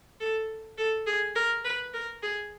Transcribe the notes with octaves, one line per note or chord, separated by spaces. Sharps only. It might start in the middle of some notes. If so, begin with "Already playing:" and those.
A4
A4
G#4
A#4
B4
A#4
G#4